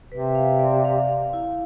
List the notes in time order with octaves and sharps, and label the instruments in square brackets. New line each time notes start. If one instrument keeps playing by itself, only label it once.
[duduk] C3 [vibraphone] B4
[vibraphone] F5
D5
F5
F5
E4